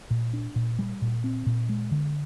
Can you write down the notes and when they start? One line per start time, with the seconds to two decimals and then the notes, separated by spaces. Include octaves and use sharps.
0.11 A#2
0.33 D4
0.56 A#2
0.79 G3
1.02 A#2
1.24 C4
1.46 A#2
1.69 G#3
1.92 D3